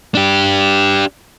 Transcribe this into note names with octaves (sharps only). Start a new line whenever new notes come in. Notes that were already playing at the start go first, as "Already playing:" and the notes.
D4 G4